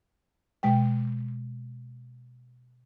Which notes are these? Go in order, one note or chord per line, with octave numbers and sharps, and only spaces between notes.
B2 G#3 G5